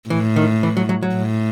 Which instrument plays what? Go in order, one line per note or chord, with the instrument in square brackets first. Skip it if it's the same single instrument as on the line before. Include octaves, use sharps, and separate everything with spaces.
[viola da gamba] A2 [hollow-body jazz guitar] E3
[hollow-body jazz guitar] D#3
E3
F#3
F#3
F#3
[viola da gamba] A2